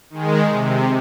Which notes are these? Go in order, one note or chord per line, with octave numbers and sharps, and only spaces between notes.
D#3 G#3
C3